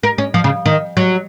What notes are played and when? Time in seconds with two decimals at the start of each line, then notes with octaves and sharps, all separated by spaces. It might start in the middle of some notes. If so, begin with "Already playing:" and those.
0.03 A#4
0.18 C#4
0.34 F3
0.44 C#3
0.66 D#3
0.97 F#3